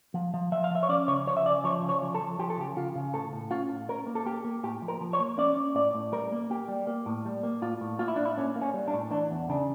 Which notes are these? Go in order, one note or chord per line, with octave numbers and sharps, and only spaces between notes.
F3
F3
F3 E5
F5
F3 E5
C#5
C#4 D5
C#3 C#5
F3 C#5
E5
C#3 D5
F3 C#5
C#3
C#5
F3
A4
F3
F3 G4
A4
C#3 G4
C#3 F4
C#3
A2 A4
A2
C#4 F4
A2
C#4 A#4
A#3
A4
A#3 G4
A#3
A2 G4
F3
A#4
F3
C#5
A#3
C#4 D5
C#4
A2 D5
A2
G3 A#4
A#3
A#3 G4
G3
A#3
A2
G3
A#3
A2 F4
A2
A#3 F4
E4
A2 D4
E4
A#3 C#4
A#3
C#4
G3
D4
A2
E3 D4
E2
C#3 D4